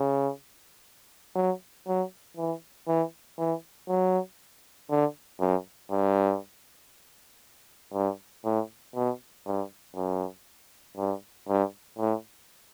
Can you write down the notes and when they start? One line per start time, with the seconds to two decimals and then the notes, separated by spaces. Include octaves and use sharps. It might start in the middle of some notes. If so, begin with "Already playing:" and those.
Already playing: C#3
1.36 F#3
1.87 F#3
2.37 E3
2.87 E3
3.38 E3
3.88 F#3
4.90 D3
5.40 F#2
5.91 G2
7.93 G2
8.45 A2
8.95 B2
9.46 G2
9.96 F#2
10.97 G2
11.48 G2
11.98 A2